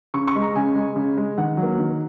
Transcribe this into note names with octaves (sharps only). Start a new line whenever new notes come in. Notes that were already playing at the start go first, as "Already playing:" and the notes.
C#3 C#6
C#6
G#3
A#5
C#3 G#5
G#3
C#3
G#3
D#3 F#5
F#3
A#3
D#3